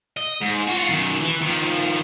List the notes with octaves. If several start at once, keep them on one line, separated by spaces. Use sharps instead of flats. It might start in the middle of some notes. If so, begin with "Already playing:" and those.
D#5
G#2
F4 F#4
F#2 D#3
E3
D#3 F3